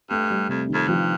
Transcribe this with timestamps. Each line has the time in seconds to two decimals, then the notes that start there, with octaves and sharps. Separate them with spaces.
0.10 G2 A3
0.30 G3
0.49 F2 C3
0.68 D#3
0.74 F2
0.88 G2 F3